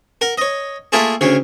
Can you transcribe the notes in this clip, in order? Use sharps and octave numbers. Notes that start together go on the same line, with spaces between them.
A#4 F#5
C#5 D#5
A3 A#3 E4 F4 G#4 A4
D2 C#3 C#5 F5